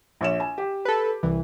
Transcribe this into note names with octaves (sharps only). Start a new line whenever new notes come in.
A#1 C#5 E7
G#5
G4
A4 B4
C2 E3